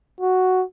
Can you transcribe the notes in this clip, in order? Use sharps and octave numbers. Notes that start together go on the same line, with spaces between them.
F#4